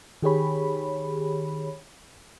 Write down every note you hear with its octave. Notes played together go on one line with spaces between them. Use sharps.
D#3 G4 G#4 C#5 B5